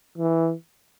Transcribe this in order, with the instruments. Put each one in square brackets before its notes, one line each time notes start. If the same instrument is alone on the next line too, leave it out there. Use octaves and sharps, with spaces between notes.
[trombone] E3